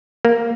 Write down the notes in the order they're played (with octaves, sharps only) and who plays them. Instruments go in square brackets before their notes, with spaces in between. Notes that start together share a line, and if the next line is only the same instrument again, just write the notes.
[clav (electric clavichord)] A#3